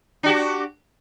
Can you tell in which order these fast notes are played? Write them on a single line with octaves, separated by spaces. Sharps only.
D4 F#4 G4